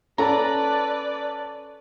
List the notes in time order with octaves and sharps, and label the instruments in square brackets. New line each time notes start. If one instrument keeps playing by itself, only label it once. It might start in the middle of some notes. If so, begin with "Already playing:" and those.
[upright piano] C#4 A4 A5 [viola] B4 D5 [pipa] A#5